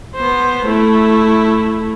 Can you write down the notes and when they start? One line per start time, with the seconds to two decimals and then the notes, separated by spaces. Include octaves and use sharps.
0.16 B3 C5
0.67 A3 E4